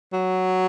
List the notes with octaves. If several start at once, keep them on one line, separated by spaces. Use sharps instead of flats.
F#3